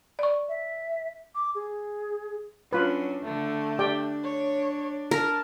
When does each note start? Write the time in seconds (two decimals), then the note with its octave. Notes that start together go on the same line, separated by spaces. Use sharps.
0.19 D5 C#6
0.49 E5
1.35 D6
1.55 G#4
2.73 F#3 C#4 D4 F4 B4
3.24 D3 A3
3.79 D4 G4 D5 G5
4.24 C#5
5.11 A#4 A5